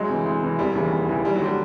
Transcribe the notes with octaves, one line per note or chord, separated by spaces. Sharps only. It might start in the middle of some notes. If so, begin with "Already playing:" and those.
Already playing: D2 F#3 G#3
C3 E3
D2
C3 E3
E1 G3
D#2 C#3 E3
E1
D#2 C#3 E3
D#2 G3
F#3
D3 G3